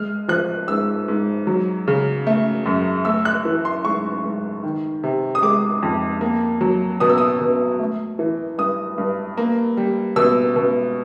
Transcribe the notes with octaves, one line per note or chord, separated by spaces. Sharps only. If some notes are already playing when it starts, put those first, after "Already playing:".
Already playing: G#3 F6
F3 F#6
G#2 E6
G#2
F#3
C#3
A3
F#2
A3 E6
F#6
E3
C6
G#2 C#6
G#2
D#3
C3
D#6
G#3 D6
F2
A#3
F#3
B2 D#6
E6
D#6
B2
A3
E3
G2 D#6
G2
A#3
G3
B2 E6
B2